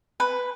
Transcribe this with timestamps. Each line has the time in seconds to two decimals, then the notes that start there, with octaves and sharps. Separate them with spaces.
0.20 B4